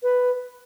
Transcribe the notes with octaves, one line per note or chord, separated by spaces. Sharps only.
B4